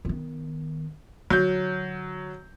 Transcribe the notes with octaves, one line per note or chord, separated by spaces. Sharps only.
D#3 B3
D3 F#3 G6